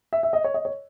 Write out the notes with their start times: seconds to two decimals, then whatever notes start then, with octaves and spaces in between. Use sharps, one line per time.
0.13 E5
0.23 E5
0.33 D#5
0.44 C#5
0.54 D#5
0.65 C#5